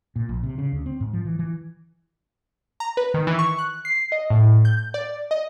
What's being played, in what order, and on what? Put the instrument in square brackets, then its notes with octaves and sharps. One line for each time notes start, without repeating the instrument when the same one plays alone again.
[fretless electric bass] A#2
A#1
C3
C#3
D2
C4
G#2
F3
E3
E3
[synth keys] A#5
B4
D#3
E3
C#6
F#6
C7
D#5
A2
G6
D5
D#5